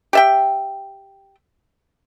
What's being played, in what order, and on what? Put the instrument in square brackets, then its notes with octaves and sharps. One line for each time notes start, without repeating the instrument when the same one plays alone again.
[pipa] G4 E5 G5